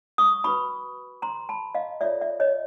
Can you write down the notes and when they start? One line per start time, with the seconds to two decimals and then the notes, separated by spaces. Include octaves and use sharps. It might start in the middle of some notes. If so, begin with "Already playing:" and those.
0.18 C#6 D#6
0.44 F#4 B4 B5 C#6
1.22 A#5 C6
1.49 A5 B5
1.75 D#5 F5
2.01 F4 A4 C#5 D5 E5
2.21 D5 E5
2.40 C#5 D#5